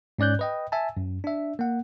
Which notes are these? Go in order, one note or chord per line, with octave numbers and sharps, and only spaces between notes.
G#2 C#4 D5 F#6 G6
B4 D#5 G5
E5 G#5 A5
F#2
D4 E5
A#3 F#5